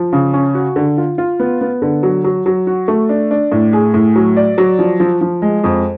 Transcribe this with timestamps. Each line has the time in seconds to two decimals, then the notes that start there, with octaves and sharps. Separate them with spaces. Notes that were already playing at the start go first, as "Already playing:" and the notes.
Already playing: F3
0.13 C#3
0.34 C#4
0.55 F#4
0.76 D3
0.98 F4
1.18 F4
1.40 B3
1.61 B3
1.82 D3
2.03 F#3
2.24 F#3
2.46 F#3
2.67 F#4
2.88 A3
3.09 D4
3.31 D4
3.52 A2
3.73 G#4
3.94 A2
4.16 F#3
4.37 D5
4.58 F#3
4.79 F3
5.00 F3
5.21 F3
5.42 G#3
5.64 F2